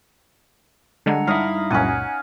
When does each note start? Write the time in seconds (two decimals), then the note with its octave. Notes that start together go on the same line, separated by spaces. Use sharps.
1.06 D3 G3 G#3 D4 F#5 A#5
1.27 G2 D#4 E4 F5 A#5 B5 D#6
1.71 C#2 F#2 A#2 C#4 D#4 F#5 G#5 F#6